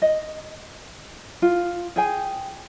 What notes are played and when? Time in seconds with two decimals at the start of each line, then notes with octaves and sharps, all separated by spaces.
0.02 D#5
1.42 F4
1.96 G#4 G5 G#5